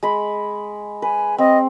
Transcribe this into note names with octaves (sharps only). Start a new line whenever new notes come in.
G#3 B5
B4 G#5
C4 D#5